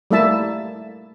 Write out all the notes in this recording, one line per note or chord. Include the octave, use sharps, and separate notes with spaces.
G3 A3 A#3 E4 E5 A5